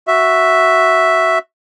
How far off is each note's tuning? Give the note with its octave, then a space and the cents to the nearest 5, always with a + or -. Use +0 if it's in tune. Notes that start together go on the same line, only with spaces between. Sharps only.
F#4 +0 E5 +0